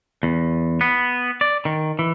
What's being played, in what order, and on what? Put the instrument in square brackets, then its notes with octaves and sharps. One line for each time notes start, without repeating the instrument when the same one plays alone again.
[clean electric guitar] E2
B3
D5
D#3
E3